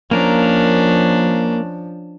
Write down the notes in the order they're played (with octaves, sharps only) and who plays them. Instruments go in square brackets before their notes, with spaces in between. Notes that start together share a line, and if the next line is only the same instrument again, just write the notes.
[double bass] F3 [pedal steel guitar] A#3 A#4 A#5 [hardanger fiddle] C#4 D4